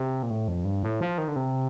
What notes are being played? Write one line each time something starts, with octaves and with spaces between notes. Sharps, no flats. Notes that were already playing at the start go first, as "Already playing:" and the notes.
Already playing: C3
A#2
A2
F2
G2
A2
F3
D#3
D3
C3